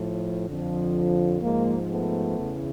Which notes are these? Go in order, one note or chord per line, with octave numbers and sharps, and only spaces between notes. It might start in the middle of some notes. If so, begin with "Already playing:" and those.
Already playing: A2 F3
F2 D3 F3
G#2 F3 G#3 A#3
A3 B3
E2 C#3 E3